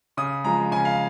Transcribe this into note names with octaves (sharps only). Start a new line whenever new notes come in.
C#3 D#6
F3 G#3 A#5
C#3 G#5
F5